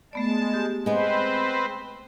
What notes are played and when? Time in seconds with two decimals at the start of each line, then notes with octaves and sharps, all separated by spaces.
0.13 G#3 A3 B3 D5 A5
0.54 G4
0.86 G#3 B3 C4 B4 C5